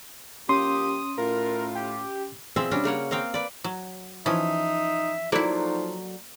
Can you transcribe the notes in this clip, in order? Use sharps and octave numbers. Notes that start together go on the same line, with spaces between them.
F3 A#3 C#4 G4 C6 D#6
A2 F4 A#4
G4
B2 F3 C4 G#4 E5
G3 C#4 D4 F#4
C#3 A#3 C#5 F#5
A#3 C4 F5 G5
B4 D5
F#3
E3 F3 C#4 D#4 E5
F3 F#3 A#3 D#4 E4 A4 D5